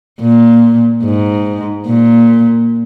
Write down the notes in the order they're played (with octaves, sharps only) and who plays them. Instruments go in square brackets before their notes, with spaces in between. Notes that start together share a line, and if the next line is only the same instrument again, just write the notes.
[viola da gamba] A#2
G#2
A#2